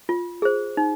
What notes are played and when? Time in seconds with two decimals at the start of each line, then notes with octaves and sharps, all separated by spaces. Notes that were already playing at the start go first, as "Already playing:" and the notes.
0.09 F4
0.42 G#4 C5
0.77 D#4